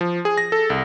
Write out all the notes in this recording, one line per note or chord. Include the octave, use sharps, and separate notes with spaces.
F3
G#4
A#6
A4
C2